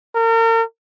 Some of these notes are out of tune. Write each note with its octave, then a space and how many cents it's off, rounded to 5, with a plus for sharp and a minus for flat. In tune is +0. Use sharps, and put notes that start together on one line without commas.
A#4 -40